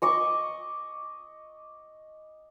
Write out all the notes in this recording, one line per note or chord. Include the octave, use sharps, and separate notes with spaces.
D#5 C#6 D6